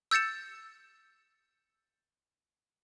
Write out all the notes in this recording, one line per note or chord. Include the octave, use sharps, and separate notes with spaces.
E6 G6 A6 C#7 E7